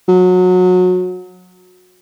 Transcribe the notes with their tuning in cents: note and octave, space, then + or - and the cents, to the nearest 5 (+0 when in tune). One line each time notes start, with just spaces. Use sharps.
F#3 -25